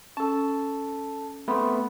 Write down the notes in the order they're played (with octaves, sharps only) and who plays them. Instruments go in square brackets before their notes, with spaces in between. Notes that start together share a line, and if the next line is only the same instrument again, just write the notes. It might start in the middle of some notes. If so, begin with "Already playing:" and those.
[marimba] C#4 [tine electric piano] A4 A5
[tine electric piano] A3 B3 C4 [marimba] B5 C6